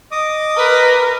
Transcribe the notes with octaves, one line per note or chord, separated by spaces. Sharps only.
D#5 D6 D#6
A#4 B4